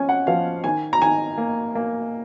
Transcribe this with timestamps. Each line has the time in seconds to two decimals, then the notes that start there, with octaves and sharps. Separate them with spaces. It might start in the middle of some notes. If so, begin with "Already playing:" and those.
Already playing: F3 C#4 G#5
0.09 F#5
0.27 F3 F5
0.64 D#3 G#5
0.93 A#5
1.02 D#3 G#5
1.38 A#3
1.75 A#3